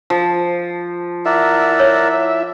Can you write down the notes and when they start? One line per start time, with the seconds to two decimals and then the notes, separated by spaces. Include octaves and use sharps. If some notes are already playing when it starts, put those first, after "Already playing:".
0.10 F3
1.26 E4 A#4 D5 E5 F#5
1.80 C#5